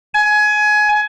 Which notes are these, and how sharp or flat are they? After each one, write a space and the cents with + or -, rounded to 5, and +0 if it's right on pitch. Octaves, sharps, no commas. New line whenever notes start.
G#5 +20